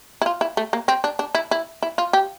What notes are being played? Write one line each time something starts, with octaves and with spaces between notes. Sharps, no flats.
E4
F4
E4
A3
A#3
C4
D4
D4
E4
E4
E4
F4
G4